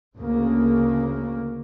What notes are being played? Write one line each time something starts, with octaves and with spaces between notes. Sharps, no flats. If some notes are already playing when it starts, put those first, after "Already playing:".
D2 C#3 A#3